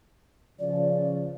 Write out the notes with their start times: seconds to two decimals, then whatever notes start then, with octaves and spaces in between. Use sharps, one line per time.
0.59 C#3 F3 D5